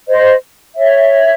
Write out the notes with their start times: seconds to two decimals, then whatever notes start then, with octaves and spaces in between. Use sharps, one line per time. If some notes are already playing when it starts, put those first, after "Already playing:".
0.07 C5 D#5
0.75 C#5 E5